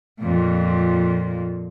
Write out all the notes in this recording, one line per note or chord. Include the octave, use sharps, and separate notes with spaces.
F2 A#2